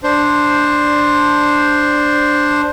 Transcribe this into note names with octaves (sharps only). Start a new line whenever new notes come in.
D4 C5